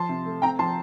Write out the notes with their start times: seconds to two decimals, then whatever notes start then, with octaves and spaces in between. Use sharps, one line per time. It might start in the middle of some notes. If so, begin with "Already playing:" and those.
Already playing: F3 A5 C6
0.09 C3
0.26 A3
0.42 C4 G5 A#5
0.59 F3 A5 C6